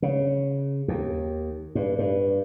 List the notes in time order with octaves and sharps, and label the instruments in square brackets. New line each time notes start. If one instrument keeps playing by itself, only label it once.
[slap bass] C#3
D#2
G2
G2